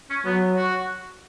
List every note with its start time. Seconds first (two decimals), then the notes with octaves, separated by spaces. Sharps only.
0.10 C#4
0.25 F#3 B3
0.57 F#4